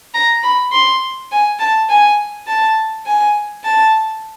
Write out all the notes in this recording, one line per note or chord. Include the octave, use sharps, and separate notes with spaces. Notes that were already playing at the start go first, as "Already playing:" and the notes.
A#5
B5
C6
G#5
A5
G#5
A5
G#5
A5